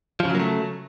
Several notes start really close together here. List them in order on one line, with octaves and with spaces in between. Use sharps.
F3 C#3 F#3 A#3 A3